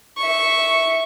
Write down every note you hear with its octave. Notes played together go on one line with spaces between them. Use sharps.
E5 C#6